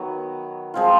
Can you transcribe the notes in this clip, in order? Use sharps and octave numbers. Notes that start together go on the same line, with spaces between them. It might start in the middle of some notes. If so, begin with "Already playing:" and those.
Already playing: D#3 F#3 B3
F3 G#3 C4 F4